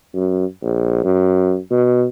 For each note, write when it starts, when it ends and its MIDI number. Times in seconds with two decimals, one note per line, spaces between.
0.14 0.45 42
0.62 1.04 34
1.04 1.57 42
1.71 2.05 47